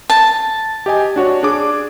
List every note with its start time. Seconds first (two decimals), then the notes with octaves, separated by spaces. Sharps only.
0.10 A5
0.86 G4 D#5 G#5
1.16 D4 F#4 C#5
1.43 D4 G#4 D6